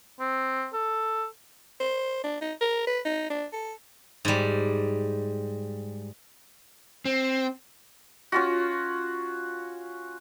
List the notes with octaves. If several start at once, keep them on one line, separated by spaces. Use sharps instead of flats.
C4
A4
C5
D4
D#4
A#4
B4
D#4
D4
A4
G#2 G3
C4
C#4 F4 F#4